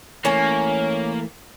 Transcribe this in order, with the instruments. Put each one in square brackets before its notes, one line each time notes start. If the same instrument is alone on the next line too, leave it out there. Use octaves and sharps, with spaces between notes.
[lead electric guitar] E3 A3 [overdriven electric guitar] A#3 [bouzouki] C#4 C#5 G#5